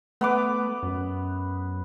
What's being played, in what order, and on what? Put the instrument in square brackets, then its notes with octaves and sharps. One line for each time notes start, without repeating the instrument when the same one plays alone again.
[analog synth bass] A3 [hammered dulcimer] B3 B4 D6
[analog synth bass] F#2